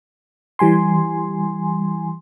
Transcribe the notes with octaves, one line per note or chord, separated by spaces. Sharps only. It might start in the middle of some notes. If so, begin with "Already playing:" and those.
E3 G3 G#5 C6